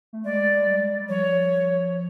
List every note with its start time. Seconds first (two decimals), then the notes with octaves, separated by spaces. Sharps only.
0.13 A3
0.25 G#3 D5
0.67 G3
1.09 F3 C#5